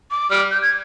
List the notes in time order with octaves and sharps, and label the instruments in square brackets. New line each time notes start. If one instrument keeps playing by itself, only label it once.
[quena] D6
[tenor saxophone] G3 [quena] F6
[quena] G6
G#6